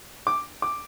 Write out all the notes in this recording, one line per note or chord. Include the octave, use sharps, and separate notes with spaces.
D6
D6